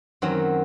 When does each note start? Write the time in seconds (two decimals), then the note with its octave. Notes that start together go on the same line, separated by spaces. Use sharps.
0.22 F#2 D#3 F#3 C4